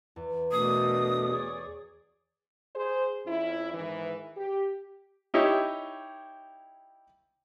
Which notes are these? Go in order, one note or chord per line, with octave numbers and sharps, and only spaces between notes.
E2
B2 A3 D4 A#4 D#6
G#4 C#5 D5
G#4 C5
F2 C#4 E4
G#2 D#3 E3
G4
D#4 E4 G4 C#5